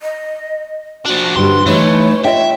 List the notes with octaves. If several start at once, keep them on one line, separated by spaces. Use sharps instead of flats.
D#5
F3 D4 F#4
G2 D3 G3 C6
E3 A3 D#4 C#5
F4 C#5 D#5 E5 G5